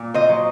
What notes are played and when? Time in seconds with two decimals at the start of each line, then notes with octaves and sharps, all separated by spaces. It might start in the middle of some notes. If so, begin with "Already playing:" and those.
Already playing: A#2
0.14 C5 D#5
0.29 F#3